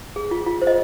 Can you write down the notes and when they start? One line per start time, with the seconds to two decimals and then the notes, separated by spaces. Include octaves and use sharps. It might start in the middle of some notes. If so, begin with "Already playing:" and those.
0.16 G#4
0.31 F4
0.46 F4
0.62 C5
0.67 D#5